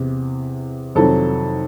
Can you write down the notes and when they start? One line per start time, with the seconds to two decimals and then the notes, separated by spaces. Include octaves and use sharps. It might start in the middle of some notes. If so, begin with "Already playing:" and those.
Already playing: E2 C3
0.95 F2 C3 D#3 F#3 A4